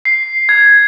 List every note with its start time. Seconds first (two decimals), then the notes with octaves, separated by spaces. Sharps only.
0.05 C7
0.49 G#6